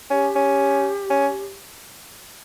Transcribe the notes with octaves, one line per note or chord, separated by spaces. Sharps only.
C#4 G4
C#4
C#4